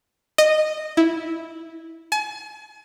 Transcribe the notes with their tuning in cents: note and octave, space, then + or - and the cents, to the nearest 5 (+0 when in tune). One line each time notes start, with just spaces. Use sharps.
D#5 -15
E4 -10
G#5 +40